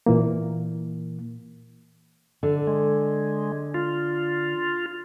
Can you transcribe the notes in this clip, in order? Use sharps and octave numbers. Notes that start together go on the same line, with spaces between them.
A#2 E3 A#3
D3
G#3
F4